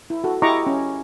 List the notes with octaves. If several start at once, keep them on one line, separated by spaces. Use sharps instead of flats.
E4
F#4 A4
E4 G4 D#5 A#5 C#6 D6
C#4